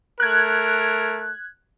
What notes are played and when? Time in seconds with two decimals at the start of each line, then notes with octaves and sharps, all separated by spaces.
0.20 A3 A#4 F#6 G#6